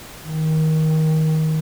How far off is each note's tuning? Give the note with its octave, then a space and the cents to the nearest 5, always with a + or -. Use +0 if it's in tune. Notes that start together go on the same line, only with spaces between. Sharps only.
D#3 +20